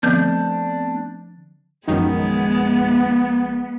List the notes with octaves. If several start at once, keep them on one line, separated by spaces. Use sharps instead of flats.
D3 F3 A3 B3 C4 D4 G6
A#1 F#2 D#3 F3 G#3 B3